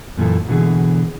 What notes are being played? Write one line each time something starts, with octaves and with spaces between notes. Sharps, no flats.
F#2 A#2 E3 A4
B2 D3 E3 G#4